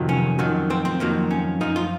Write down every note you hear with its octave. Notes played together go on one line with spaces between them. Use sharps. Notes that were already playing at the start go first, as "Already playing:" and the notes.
Already playing: F2 C3 D#3 F#3
C#4
F2 D#3 F#3
C4
C4
F2 D#3 F#3 A#3
C#4
F#2 F3 D#4
F4